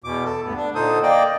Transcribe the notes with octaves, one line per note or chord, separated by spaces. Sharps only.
E2 B2 D6
A4
D2 G2 B3
D4
A#2 D3 D#4 A4 C5 D#6
A#3 D5 D#5 G5